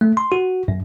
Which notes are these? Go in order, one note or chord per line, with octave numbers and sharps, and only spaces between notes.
A3
C6
F#4
F#2